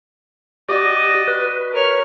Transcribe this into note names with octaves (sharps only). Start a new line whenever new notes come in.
F#4 G4 D5 D#5
B4
A#4 C#5 F6